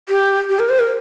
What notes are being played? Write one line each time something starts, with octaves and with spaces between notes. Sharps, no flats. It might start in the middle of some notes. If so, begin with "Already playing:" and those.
G4
G4
A#4
C5
A#4